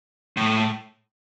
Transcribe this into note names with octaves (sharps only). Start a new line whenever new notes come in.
A2